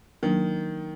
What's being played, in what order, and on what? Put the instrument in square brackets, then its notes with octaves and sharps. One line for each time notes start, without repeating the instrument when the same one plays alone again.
[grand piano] D#3 [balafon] F#3 A#3 D4